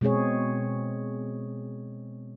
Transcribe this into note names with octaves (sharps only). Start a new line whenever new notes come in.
B2 G#3 C4 G#4 C#5